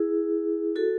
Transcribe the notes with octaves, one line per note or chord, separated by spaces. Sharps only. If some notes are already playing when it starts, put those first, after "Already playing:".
Already playing: E4 G#4
F#4 A4